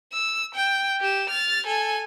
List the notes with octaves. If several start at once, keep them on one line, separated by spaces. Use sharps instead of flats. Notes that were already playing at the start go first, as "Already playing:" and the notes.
E6
G5
G4 E7
F6 A6
A4 G#5